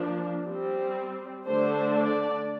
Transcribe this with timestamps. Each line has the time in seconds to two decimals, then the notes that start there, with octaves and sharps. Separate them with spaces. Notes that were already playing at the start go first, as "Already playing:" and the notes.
Already playing: F3 A#3 D4
0.46 G3 C4
1.46 D3 A3 D4 C5
1.98 D5